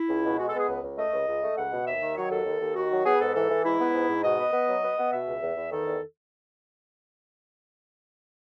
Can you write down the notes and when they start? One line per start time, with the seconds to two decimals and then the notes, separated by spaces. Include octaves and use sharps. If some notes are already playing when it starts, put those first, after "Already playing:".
Already playing: E4
0.09 C#2
0.24 B2
0.38 G#3 F#4
0.48 A4
0.53 B3 G#4
0.68 C#2
0.83 C#2
0.98 A3 D#5
1.12 C#2
1.27 C#2
1.43 A3
1.57 C#2 F#5
1.72 B2
1.86 D#2 E5
2.01 D#3
2.16 F#3 C#5
2.31 D#2 A4
2.45 D#2
2.61 D#2
2.75 D#3 F#4
2.91 F#3
3.05 B3 G#4
3.15 B4
3.20 G#2 A4
3.35 E3 A4
3.49 E3
3.64 G#2 E4
3.79 B3
3.93 G#2
4.09 G#2
4.24 B2 D#5
4.38 B3
4.53 B3
4.68 F#3
4.83 B3
4.98 B3
5.12 B2 E5
5.27 C#2
5.42 E2
5.56 E2
5.71 D#3 A4
5.86 E2